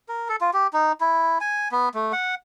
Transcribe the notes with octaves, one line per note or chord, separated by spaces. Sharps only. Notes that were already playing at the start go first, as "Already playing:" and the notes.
A#4
A4
F4
G4
D#4
E4
G#5
B3
A3
F#5